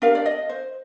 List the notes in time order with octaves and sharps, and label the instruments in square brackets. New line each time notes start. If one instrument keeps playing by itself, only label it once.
[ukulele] D4 G4 A#4 F5
D5
D#5
C5